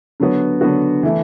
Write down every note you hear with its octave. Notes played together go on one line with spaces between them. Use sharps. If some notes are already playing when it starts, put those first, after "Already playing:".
D3 F#3 B3 F#4
D3 F#3 B3 F#4
E3 A3 E4